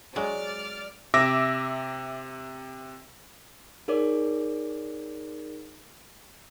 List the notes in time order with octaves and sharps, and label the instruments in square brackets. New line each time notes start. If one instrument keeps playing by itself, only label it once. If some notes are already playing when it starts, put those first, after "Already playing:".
[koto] F#3 G#3 [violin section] D5 F6
[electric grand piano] C3 E5 D6 E6 A#6
[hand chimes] D#4 G#4 A#4 C#5 D5 D6